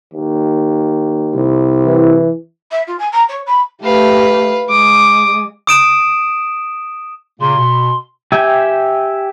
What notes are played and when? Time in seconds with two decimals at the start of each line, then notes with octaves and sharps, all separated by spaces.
0.13 D#2
1.34 C2
1.86 E3
2.71 E5
2.87 F4
2.99 G#5
3.12 A#5
3.29 C#5
3.47 B5
3.83 A3 G4 B4 F5
4.69 G#3 D6 D#6
5.67 D#6 D7 E7
7.40 A#2 C#3 A#3 C6
7.57 B2
8.32 G4 E5 G5 G#5